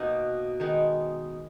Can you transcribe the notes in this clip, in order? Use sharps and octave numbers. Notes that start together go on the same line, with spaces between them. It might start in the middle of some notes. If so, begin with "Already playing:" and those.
Already playing: B2 A#3 D#4 D#5 F#5
D#3 G#3 B3 D#4